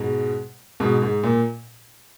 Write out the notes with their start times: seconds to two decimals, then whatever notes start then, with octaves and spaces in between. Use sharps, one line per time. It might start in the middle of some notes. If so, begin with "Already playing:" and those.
Already playing: G#2 B2
0.80 G#2 B2
1.02 G#2
1.23 A#2